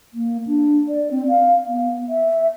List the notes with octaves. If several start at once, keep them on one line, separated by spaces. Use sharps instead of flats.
A#3
D4
D5
C4
F5
B3
E5